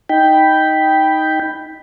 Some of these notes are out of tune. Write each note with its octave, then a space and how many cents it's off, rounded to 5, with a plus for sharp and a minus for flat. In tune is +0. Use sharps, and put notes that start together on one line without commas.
D#4 +10 G5 +0 B5 +0